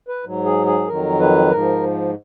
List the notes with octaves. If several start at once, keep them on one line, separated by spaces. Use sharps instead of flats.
B4
G#2 F#3
G#4
G#4
F2 D#3 F#3 A#4
B4
G#2 F3 A#4